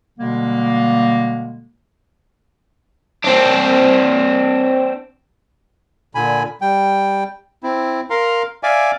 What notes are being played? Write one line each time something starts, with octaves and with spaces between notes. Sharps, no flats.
B2 D3 G3 G#3 A#3
C4 D4
A#2 D3 G#5 B5
G3 G5
C4 E4
A#4 F5 A#5 C6
D5 E5 F5 G#5 D6